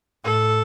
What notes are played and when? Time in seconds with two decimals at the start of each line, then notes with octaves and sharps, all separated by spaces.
0.24 A2 A4